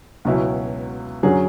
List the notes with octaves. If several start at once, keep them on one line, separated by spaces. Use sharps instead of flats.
C#2 B2 F#3 C#4 E4
F#2 D3 F#3 C#4 G#4